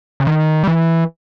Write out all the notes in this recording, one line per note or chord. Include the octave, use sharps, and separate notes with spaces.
C#3
D#3
G3
E3